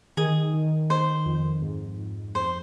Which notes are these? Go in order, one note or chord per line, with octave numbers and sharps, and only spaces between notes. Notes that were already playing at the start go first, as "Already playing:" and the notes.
D#3 G#4
D#3
D#3 C5
F2
G#2
G#2
F2 C5